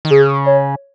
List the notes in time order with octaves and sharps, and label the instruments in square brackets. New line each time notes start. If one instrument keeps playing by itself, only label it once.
[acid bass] D#3
[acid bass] C#3 [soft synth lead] G#4
[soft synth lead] C#5